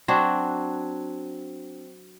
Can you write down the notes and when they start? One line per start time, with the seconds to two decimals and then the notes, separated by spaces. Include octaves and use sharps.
0.08 F#3 C4 D4 F#4